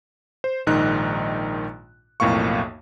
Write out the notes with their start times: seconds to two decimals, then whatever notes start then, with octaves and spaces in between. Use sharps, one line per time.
0.44 C5
0.67 A#1 G#2 D#3 D#4 F#6
2.20 B1 F2 A2 A#3 F5 C#6